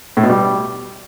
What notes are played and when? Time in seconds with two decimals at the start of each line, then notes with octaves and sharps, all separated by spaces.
0.17 A2
0.23 B2
0.30 G3